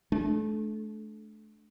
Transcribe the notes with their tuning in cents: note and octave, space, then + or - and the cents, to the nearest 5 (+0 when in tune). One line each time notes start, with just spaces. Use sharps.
A3 -30 D4 +0